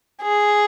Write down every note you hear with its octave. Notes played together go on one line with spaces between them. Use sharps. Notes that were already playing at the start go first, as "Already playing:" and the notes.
G#4